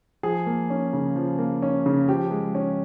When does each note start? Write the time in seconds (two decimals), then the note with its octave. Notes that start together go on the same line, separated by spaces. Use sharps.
0.23 F3 G#4
0.47 A#3
0.70 C#4
0.93 C#3
1.16 F3
1.39 A#3
1.62 C#4
1.86 C#3
2.08 F3 G4
2.31 G#3
2.55 C#4